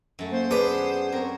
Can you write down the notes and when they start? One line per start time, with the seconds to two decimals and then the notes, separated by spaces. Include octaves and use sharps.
0.19 F#2 A3
0.32 A#3 C5
0.51 B3 D4 G#4 B4
1.12 C4 A#4 C#5